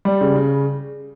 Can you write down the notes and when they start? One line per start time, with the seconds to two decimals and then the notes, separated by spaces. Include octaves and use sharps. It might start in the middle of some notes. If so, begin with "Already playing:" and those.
0.05 G3
0.21 C#3
0.36 C#3